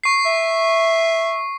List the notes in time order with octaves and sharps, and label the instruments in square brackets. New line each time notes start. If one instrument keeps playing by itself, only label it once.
[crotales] C#6 C7
[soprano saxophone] E5